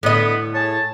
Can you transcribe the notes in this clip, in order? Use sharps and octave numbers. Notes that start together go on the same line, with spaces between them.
A2 D3 B3 D#5
G#4 C#5 A5